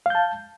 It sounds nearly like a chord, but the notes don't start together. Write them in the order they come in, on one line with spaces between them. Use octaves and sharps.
F5 G6 A5